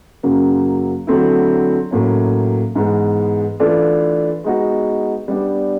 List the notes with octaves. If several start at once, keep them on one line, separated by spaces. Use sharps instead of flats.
F#2 C#3 F#3 A#3
D3 F#3 A3 C4 E4
A2 F#3 A#3 C#4
G#2 E3 G#3 B3
E3 A3 D4 F4 A4
G#3 B3 D#4 F#4
G3 B3 D4